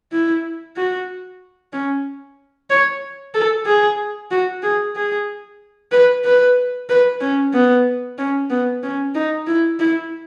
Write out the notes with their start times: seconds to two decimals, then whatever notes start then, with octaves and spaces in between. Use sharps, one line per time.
0.12 E4
0.76 F#4
1.73 C#4
2.70 C#5
3.34 A4
3.66 G#4
4.31 F#4
4.63 G#4
4.96 G#4
5.92 B4
6.25 B4
6.89 B4
7.21 C#4
7.53 B3
8.18 C#4
8.50 B3
8.83 C#4
9.15 D#4
9.47 E4
9.79 E4